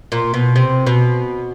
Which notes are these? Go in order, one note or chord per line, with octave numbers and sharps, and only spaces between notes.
A#2
B2
C3
B2